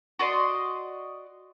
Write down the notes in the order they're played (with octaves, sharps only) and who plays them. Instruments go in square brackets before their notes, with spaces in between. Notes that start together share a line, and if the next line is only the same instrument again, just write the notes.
[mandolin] F#4 D5 D#5 C6